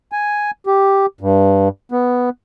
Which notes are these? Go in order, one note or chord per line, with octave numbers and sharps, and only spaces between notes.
G#5
G4
G2
B3